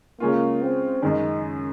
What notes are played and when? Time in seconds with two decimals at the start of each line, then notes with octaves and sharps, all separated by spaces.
0.20 C#3 G#3 A#3 C#4 F4
0.62 C4
1.02 F#2 D#3 G#3 D#4